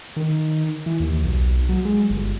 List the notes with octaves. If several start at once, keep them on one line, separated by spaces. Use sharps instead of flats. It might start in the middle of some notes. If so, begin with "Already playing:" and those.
D#3
E3
D#2
B1
F#3
G#3
G1